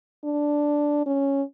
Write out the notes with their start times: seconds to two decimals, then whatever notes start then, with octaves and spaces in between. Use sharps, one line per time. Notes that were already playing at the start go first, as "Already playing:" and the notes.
0.24 D4
1.06 C#4